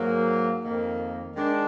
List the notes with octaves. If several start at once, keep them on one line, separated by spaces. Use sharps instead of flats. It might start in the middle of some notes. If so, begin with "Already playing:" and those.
Already playing: G#2 F#3 A#3
F2 D#3 A#3
D#3 G#3 D4